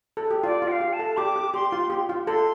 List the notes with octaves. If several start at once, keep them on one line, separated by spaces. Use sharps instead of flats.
A4
G4
F4 D5
F4
G5
F5
G4
A5
A4
G4 D6
G4
G4 C6
F4
G4
F4
A4 C6